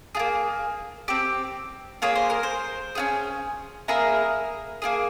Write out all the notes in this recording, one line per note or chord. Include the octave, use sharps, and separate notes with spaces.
A#3 F4 G#4
C4 G4
A#3 F4 G#4 C#5
C5
A#4
C5
C#4 F4 G#4
A#3 E4 G#4 A#4
A#3 F4 G#4